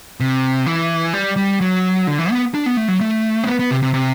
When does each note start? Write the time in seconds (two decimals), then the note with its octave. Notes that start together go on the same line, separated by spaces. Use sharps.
0.20 C3
0.66 E3
1.13 G3
1.37 G3
1.61 F#3
2.07 D3
2.18 E3
2.31 B3
2.54 D4
2.66 B3
2.77 A3
2.88 F#3
3.01 A3
3.44 C4
3.47 B3
3.59 B3
3.71 C3
3.83 C3
3.94 C3